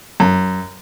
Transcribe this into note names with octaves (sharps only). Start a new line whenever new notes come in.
F#2